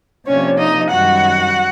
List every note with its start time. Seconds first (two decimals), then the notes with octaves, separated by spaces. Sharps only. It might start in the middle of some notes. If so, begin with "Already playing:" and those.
0.26 C3 F3 A#3 C#4 D4 C#5
0.58 D#4 D#5
0.90 F#2 D#3 G3 F#4 F#5